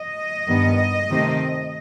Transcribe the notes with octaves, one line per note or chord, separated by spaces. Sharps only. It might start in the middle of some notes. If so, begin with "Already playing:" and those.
Already playing: D#5
G2 D#3 G3 B3
C3 D#3 A3 C4